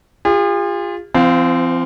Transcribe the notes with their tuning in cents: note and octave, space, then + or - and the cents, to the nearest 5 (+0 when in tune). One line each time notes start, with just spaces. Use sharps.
F4 +0 G#4 -45
F3 -45 C4 -15 F5 +10